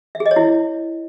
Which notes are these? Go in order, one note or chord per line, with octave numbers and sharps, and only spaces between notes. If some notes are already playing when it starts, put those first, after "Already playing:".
E5
G#4
D#5
C#5
E4